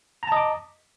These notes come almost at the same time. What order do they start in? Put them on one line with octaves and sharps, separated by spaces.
A#5 A5 D#5 D6